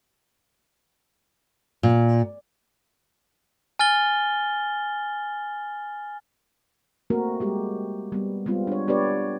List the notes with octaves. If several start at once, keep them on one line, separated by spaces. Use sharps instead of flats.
A#2
G#5 F6 A6 G7
A3 A#3 C4 F#4 A#4
G3 G#3 G4
G3 B3
G3 G#3 B3 C4 F4
D4 C#5
B3 D4 G4 B4 C#5 D5